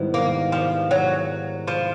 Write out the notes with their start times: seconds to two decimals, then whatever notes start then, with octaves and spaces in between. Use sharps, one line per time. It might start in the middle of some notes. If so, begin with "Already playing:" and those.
Already playing: G#2 D#3 G3 B3 E4
0.14 A#3
0.52 F3
0.91 F#3
1.68 F3